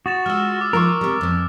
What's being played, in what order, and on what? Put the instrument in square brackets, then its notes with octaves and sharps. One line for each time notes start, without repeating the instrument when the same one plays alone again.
[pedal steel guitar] F#4 [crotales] D#6 A6 E7
[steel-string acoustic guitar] G#3 F4 [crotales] E6 F6
[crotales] D6
[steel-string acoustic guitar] F3 D#4 F4 [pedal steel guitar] A#4 C#6
[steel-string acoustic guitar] C3 G3
F2 E3